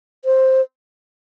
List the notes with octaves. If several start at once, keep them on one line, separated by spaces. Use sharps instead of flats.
C5